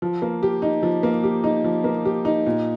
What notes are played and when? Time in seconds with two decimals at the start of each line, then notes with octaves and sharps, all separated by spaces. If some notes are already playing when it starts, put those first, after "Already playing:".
0.02 F3
0.22 A#3
0.43 G4
0.62 D#4
0.83 F3
1.03 A#3
1.23 G4
1.44 D#4
1.64 F3
1.84 A#3
2.05 G4
2.25 D#4
2.46 A#2